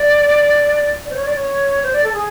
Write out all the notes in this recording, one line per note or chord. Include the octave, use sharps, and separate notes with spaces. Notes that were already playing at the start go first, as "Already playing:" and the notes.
Already playing: D5
D5
C5
C#5
D5
C#5
C5
D5
A4
G#4